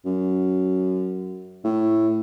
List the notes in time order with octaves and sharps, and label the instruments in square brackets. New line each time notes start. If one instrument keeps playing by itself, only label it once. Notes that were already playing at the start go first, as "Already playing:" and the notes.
[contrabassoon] F#2
A2